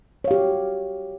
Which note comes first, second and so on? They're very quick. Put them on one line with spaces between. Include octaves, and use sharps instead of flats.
C#5 F5 G4 F#4